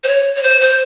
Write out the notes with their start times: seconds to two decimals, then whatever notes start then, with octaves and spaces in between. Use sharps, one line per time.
0.04 C5
0.08 C#5
0.35 C#5
0.43 C5
0.61 C5